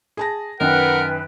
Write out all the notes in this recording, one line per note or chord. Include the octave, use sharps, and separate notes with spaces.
G#4 A5 A#6
F#2 D#3 D#4 A#4 B4 F#5 G5